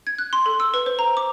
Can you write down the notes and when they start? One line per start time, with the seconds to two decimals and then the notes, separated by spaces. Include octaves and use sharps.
0.07 G#6
0.18 F#6
0.33 C6
0.46 A4
0.60 E6
0.74 B4
0.86 C5
0.99 A#5
1.17 D6